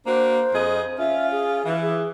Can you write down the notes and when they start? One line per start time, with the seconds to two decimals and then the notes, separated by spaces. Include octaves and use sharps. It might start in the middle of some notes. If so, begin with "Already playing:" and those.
0.06 A#3 D4 F#4 C5
0.53 F2 G#4 D#5
0.99 C#4 F4 E5
1.31 G#4
1.65 E3
1.82 G#4